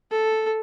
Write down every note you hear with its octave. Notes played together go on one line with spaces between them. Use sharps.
A4